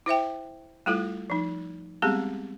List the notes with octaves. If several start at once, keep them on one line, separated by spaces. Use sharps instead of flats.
E4 C5 E5 G5
G3 A3 E4 F4 A4
F3 D#4
G3 G#3 B3 C4 G4 G#4